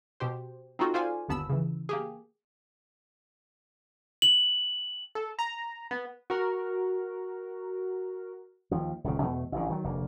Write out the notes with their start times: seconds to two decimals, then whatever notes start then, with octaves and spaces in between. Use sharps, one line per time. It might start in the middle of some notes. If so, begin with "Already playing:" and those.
0.20 B2 G4 C5
0.79 C4 D#4 F4 F#4 A4
0.94 F4 A4 C5 D5 F5 G#5
1.28 G1 D#2 B3 A5 B5 E6
1.50 C#3 E3
1.89 A#3 G4 G#4
4.22 F#7
5.15 A4
5.39 A#5
5.91 B3
6.30 F#4 A#4
8.71 D#2 F3
9.04 D#1 C#2 C#3
9.21 E2 B2 A3
9.52 A1 A2 D3
9.70 D#3 F#3
9.85 F1 D2 A#3